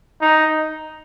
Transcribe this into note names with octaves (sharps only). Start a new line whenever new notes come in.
D#4